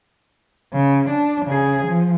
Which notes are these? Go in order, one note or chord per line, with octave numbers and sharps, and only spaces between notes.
C#3
D4
C#3 G#4
F3